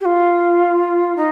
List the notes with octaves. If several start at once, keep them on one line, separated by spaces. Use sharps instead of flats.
G4
F4
D#4